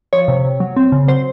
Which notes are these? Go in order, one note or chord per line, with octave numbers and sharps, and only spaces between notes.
F3 C#5
C3
C3
F#3
C4
C#3
F#3 C5